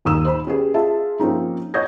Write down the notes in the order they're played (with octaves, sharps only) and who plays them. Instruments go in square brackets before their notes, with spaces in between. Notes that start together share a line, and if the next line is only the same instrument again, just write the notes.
[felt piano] D#1 D#2 D#4 D#6 E6 E7
C5 B5
C#4 G4 G#4 B4
F4 G#4 E5 A5
F3 A#3 C4 C#4 D#4
C#5 D#5 D#6 G6 G#6 A#6